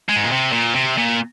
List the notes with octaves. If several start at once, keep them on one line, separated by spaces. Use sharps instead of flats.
G#3
G#2
A#2
C3
A#2
C3
A#2